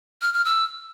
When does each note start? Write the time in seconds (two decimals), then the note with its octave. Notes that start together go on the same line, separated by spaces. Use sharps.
0.22 F6
0.33 F6
0.45 E6